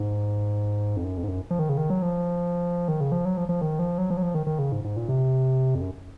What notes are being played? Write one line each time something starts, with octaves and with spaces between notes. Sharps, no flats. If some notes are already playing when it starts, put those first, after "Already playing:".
Already playing: G#2
F2
F#2
F2
G#2
F#2
F3
D#3
C#3
D#3
F#3
F3
D#3
C#3
F3
F#3
F3
F3
D#3
F3
F#3
F3
F#3
F3
D#3
D#3
C#3
G#2
G#2
A#2
C3
F2
F#2